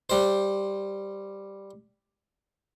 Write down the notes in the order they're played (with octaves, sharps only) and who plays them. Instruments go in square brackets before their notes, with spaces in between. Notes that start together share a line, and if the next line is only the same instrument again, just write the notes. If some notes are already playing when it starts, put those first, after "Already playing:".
[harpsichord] G3 C5